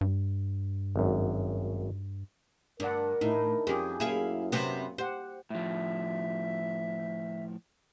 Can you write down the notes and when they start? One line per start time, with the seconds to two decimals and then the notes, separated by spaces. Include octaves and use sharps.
0.01 G2
0.96 G#1 F#2
2.80 G2 D4 A#4 D5 F#5
3.21 A2 D#4 E4
3.67 F2 C#4 G4 G#4
4.00 F#2 A#3 E4 G#4 F5
4.52 C3 B3 C4
4.98 G4 C5 F#5
5.50 A2 F3 E5